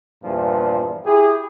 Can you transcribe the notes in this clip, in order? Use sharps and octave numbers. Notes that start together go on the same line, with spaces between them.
E2 G2 A#2 F3 G3
E4 G4 G#4